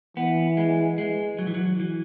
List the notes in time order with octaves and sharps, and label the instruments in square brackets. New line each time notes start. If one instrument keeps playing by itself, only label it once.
[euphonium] E3 [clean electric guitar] B3
[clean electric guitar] G#3
G#3
F#3
E3
F#3
E3